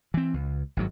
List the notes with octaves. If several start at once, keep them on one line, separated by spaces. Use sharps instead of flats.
E3 C4
C#2
G#1 G2 F#3